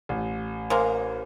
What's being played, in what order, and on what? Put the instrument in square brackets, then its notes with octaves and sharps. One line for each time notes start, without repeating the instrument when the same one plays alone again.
[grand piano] A1
[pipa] G#3 A#3 [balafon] A#4 [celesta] C5